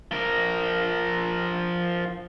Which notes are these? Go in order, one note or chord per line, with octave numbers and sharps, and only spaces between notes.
F3 A#4